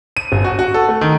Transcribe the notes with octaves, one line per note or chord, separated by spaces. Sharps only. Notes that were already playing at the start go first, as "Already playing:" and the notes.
D#7
G1
F#4
F#4
A4
A3
D#3